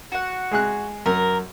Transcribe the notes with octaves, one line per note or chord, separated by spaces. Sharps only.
F#4 F#5
G#3 G#4 F#6
F#2 A#4